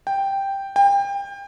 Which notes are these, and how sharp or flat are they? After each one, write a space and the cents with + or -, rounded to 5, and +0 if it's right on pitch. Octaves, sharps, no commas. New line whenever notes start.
G5 +0
G5 +30